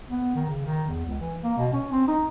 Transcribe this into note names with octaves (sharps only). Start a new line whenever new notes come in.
B3
D#3
C#3
D#3
E2
C#2
E3
A#3
B2
C#4
C4
D#4